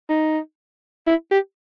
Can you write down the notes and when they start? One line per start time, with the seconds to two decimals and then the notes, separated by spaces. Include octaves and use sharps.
0.09 D#4
1.07 E4
1.31 G4